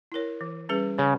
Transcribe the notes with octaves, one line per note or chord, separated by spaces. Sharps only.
E4 A#4 C#5
E3
G3 C#4 G#4 B4
C#3 C#4